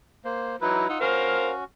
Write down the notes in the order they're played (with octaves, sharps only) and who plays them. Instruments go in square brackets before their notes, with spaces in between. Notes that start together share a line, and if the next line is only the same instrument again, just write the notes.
[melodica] A#3 C5
[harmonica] E3 F#3 [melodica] D#4 E4 B4
[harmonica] D#4 [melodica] F4 F#5 E6
[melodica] C#4 F#4 [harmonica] A#4 C5 F5